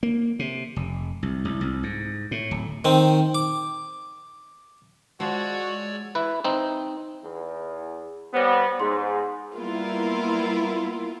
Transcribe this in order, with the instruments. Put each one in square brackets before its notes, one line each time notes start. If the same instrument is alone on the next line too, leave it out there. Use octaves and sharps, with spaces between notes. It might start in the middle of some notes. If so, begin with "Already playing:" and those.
[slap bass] A#3
C3
F1
C2
C2
C2
G#2
A2
D1
[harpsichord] D#3 C4
D6
[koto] F3 [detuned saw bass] G#3 [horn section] F#4 [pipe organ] C#5 D5 E6
[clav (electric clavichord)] E4 B4
C4 D#4
[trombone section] E2
[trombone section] G3 B3 [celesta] C5 C#5 A#6
[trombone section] G#2 [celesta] G#4 C6
[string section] G3 A#3 B3 E4 F4 A#4